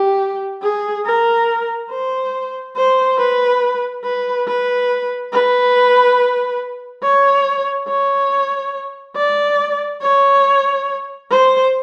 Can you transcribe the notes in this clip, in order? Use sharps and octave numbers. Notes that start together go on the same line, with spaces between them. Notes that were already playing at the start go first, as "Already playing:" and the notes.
Already playing: G4
G#4
A#4
C5
C5
B4
B4
B4
B4
C#5
C#5
D5
C#5
C5